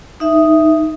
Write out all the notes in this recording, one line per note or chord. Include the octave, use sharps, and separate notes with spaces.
D#4 E5